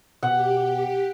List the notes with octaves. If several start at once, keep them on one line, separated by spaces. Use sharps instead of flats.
B2 G4 F#5